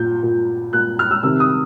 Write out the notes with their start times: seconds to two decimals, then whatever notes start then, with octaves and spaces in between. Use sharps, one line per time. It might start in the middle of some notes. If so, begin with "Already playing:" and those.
Already playing: A#2 G6
0.23 A#2
0.73 A#2 F#6
0.99 F6
1.11 E6
1.23 C3 D#3 E6
1.40 D#6